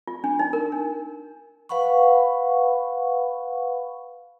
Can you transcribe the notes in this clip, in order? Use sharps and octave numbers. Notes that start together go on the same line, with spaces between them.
F4
D4
D#4
A#4
D4
B4 F5 F#5 B5 C#6